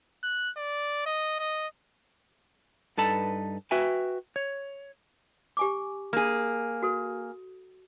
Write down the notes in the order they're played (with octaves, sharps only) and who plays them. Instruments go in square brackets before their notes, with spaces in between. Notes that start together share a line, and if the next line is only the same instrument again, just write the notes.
[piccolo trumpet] F#6
D5
D#5
D#5
[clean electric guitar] G2 D#4 A4 B4 A5 B5
F#4 B4 E5 G5 G#5
C#5
[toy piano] G4 G#5 D6
[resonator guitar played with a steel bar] A#3 G#4
[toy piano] F#4 A4